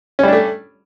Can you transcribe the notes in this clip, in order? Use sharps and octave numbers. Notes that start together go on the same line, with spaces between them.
G3 A3 C#4 D4